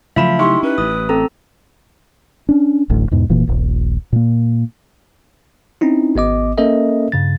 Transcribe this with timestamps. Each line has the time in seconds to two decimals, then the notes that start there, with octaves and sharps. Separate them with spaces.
0.16 C#3 F3 F#3 A3 E5 B5 E7
0.39 D#4 E4 G4 C6 C#6
0.63 C#4 B4
0.78 A1 D#6
1.09 C4 A4 A#5
2.49 C#4 D4
2.89 D1 A1 D2 A2
3.11 E2 G#2 B2
3.29 F1 A#2 E3 A#3
3.47 D#1 A#1
4.13 A#2 A#3
5.81 C4 C#4 D#4 E4
6.16 G#1 B3 D#5 D6
6.58 A#3 C#4 A4 A#4 D#5 E5
7.12 G2 C#3 A6